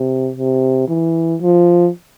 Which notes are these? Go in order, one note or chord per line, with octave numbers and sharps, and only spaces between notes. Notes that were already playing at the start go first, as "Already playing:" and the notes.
Already playing: C3
C3
E3
F3